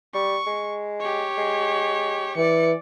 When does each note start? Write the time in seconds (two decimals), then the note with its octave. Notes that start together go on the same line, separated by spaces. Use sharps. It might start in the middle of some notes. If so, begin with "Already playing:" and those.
0.14 G3 C#6
0.47 G#3
1.00 G4 C#5
1.38 G#3
2.37 E3 D5 C#7